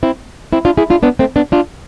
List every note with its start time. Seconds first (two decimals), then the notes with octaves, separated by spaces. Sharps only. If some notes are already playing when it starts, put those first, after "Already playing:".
0.03 C4 E4
0.53 C4 E4
0.65 D4 F4
0.77 E4 G#4
0.90 D4 F4
1.03 B3 D4
1.19 A3 C4
1.36 B3 D4
1.52 D4 F4